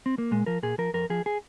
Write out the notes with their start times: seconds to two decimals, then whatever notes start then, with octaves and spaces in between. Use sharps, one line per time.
0.06 C4
0.18 A#3
0.31 A#2 G#3
0.46 F3 A#4
0.63 A#2 G#4
0.78 F3 A#4
0.94 F2 A#4
1.10 F3 G#4
1.26 G#4